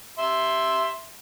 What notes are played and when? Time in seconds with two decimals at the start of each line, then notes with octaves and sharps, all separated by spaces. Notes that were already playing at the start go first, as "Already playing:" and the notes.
0.18 E5 C6